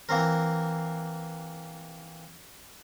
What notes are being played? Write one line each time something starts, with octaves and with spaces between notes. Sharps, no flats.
E3 A#3 C4 A#4